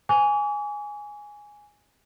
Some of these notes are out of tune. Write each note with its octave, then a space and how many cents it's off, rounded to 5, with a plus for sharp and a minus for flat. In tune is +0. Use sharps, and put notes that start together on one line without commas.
G#5 -5 D6 -45